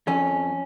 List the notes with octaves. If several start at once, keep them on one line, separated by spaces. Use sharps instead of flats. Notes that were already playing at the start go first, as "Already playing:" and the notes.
F2 C#4